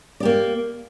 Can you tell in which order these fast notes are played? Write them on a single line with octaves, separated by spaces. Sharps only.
D5 G4 A#3